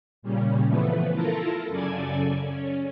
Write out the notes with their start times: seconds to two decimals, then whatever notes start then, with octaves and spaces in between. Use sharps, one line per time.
0.22 A#2 C#3 G3 C#4
0.66 E3 F3 A3 B3 B4
1.13 E4 F4 A4 A#4 A5 A#5
1.69 F#2 C#3 A4 D5 G#5 G#6
2.48 C#4